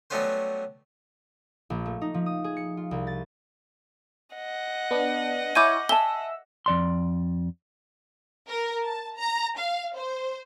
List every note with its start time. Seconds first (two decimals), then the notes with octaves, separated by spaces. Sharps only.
0.10 F#3 G3 A3 B3 C#4 C5
1.70 A#1
1.86 A3
2.01 D#4
2.14 F3
2.26 D#6
2.44 G#4
2.57 C#7
2.77 F4
2.91 C2
3.07 A6
4.36 D#5 F#5
4.91 B3 D4
5.55 E4 C#5 G#5 D6 G6 D#7
5.89 E5 G#5 A5 E6 G7
6.66 F2 D5 C6
8.48 A#4
8.85 A5
9.17 A#5
9.58 F5
9.97 C5